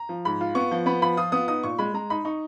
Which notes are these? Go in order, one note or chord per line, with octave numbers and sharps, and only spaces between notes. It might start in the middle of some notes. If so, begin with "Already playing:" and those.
Already playing: A#5
F3
G#2 B5
F4
B3 C#6
F3
B3 B5
F3 B5
F4 D#6
B3 D#6
D#4 D#6
A#2 C#6
G#3 B5
G#3 A#5
D#4 B5
D#4 C#6